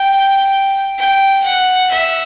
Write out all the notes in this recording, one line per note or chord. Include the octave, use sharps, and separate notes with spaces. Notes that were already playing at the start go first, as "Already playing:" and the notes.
Already playing: G5
G5
F#5
E5